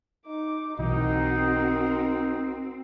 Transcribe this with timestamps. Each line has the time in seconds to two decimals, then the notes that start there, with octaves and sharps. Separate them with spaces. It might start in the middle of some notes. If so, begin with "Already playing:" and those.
0.25 D#4 D6
0.79 B1 E3 C4 D#4 F#4 A#4